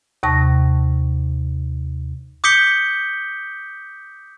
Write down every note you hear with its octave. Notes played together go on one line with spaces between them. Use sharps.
D#2 C3 A5 C#6 A#6
D6 D#6 G6 B6 C#7 G7